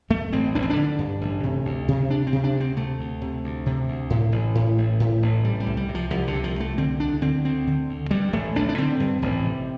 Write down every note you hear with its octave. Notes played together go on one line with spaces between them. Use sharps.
G2 A3
A1 C4
A1 D4
C4
D4
D3
G2
A1
C3
D2
C3
D2 D4
C4
C3
D4
D2
C4
C3 A3
D2
C3
D2
C3
D2
A2
A1
A2
A1
A2
A1
C3 G3
G3
C2
G3
C3
F3
C2 F3
D3
C3
F3
C2 A3
D3 C4
D2 D4
D3 C4
D2 C4
D3
D2
G2 G3
A1 A3
A1 D4
D4
D3 C4
G2
A1
C3